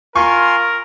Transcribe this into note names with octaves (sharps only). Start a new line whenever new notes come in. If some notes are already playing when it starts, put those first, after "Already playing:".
F4 A#4 G#5 C6 C#6